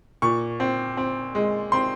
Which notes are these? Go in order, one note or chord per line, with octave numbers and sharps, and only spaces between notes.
A#2 C#6
C4
C4
G#3
C4 C6